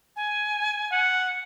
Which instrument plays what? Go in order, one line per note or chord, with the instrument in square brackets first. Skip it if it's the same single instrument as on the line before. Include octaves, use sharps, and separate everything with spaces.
[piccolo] G#5
[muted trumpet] F#5